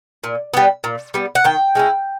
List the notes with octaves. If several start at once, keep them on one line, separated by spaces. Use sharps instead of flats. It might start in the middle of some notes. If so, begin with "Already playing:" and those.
A#2
G3 B3
A#2
G3 B3
F#5
D#3 G5
G#3 C#4 E4